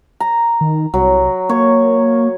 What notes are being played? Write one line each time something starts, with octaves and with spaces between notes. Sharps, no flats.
A#5
D#3
C2 F#3
A#3 C#5